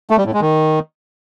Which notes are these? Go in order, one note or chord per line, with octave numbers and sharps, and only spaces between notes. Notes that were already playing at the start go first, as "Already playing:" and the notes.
A3
G3
A2
G#3
D#3